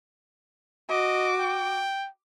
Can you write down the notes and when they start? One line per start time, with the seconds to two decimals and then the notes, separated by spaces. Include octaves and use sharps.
0.90 F#4 D#5 D6
1.39 G5